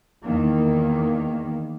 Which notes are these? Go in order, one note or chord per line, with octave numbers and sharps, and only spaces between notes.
E2 D#3 A#3